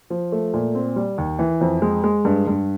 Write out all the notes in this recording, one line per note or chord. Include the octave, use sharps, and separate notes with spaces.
F3
A3
A#2
C4
G3
D#2
E3
F2
G#3
G#3
G2
G2